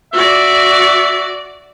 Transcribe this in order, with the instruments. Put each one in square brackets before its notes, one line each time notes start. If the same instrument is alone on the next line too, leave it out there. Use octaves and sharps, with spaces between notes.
[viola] F#4 D5 [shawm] E5